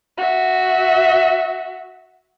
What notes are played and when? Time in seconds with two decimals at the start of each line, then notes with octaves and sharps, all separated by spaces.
0.18 F#4 E5